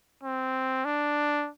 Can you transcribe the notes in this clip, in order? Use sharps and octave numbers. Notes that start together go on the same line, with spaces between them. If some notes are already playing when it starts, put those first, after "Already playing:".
C4
D4